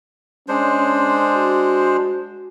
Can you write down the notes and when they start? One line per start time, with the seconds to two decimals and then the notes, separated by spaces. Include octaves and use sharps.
0.48 G#3 C#4 D4 C5
1.35 F#4